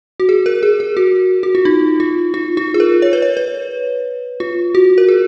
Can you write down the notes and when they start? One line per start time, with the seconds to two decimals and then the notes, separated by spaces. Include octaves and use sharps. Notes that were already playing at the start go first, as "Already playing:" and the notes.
0.20 F#4
0.29 G#4
0.46 A#4
0.63 G#4
0.80 G#4
0.97 F#4
1.43 F#4
1.55 F4
1.65 D#4
2.00 F4
2.34 F4
2.57 F4
2.74 G#4
2.80 A#4
3.02 C#5
3.13 B4
3.22 C#5
3.37 B4
4.40 F4
4.75 F#4
4.98 A#4
5.08 G#4